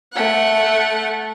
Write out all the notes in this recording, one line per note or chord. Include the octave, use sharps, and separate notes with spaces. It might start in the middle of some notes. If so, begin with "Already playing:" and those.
A3 F#5